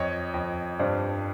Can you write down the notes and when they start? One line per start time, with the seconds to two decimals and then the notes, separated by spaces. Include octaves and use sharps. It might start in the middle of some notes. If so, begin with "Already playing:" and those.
Already playing: F2 C#5 D#5
0.34 F2
0.79 G2 C5 D5